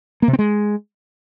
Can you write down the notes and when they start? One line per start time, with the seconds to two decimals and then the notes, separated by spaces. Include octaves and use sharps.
0.22 A#3
0.28 C3
0.33 C4
0.39 G#3